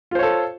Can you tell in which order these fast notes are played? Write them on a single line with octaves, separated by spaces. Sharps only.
F4 C5 C#5 A4